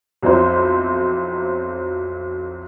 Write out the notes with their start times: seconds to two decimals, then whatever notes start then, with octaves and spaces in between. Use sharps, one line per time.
0.22 B1 F2 F#3 C4 E4 C5